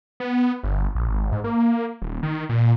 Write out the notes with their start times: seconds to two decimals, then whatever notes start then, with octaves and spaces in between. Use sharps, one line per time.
0.20 B3
0.63 G1
0.95 A#1
1.08 G#1
1.32 G#2
1.44 A#3
2.02 D#1
2.23 D#3
2.49 A#2